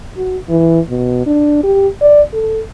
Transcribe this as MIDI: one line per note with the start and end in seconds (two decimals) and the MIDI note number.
0.17 0.38 66
0.49 0.80 52
0.89 1.26 47
1.26 1.60 62
1.63 1.87 67
2.01 2.22 74
2.33 2.61 69